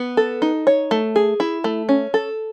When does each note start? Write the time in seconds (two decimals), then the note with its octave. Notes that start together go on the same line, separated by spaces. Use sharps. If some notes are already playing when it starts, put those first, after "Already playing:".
Already playing: B3
0.17 A4
0.42 D#4
0.67 C#5
0.91 A3
1.16 G#4
1.40 E4
1.64 A3
1.89 C#4
2.14 A4